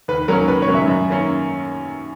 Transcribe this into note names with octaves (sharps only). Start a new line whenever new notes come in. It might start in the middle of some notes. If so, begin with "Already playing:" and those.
D#2 B4
D#3 F#3 A#3 C#4 A#4
D#2 B4
C#5
D#3 F#3 A#3 C#4
E5
F#2
D#3 A#3 C#4